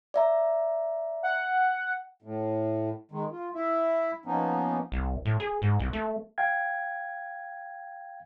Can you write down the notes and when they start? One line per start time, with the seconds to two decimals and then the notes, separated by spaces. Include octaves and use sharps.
0.14 D5 E5 A#5
1.23 F#5
2.22 A2
3.12 D#3 G#3
3.32 F4
3.55 E4 E5
4.26 F3 A#3 B3 C#4 D#4
4.92 C2
5.25 A2
5.40 G#4
5.62 G#2
5.80 C2
5.93 A3
6.38 F5 G5 G#6